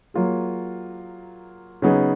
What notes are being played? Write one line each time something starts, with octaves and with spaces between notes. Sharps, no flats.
F#3 A#3 F4 G#4
C#3 F#3 B3 D#4 G#4